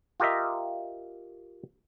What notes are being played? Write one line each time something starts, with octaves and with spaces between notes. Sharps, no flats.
F4 G4 A#4 D#5 E5